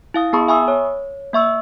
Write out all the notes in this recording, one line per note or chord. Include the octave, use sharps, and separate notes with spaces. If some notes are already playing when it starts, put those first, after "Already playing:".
E4 F5 D#6
B3 G#4 A5 B5 C#6 D#6
E5 G#5 B5 C#6 D#6 E6
C#5
A#3 E5 C#6 E6